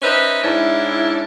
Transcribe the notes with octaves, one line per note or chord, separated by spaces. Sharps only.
C#4 D#4 B4 C5 E5
G#2 C#4 D4 E4